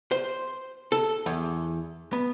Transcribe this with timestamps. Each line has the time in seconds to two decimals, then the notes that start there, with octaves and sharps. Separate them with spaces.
0.11 C5
0.92 A4
1.26 E2
2.13 B3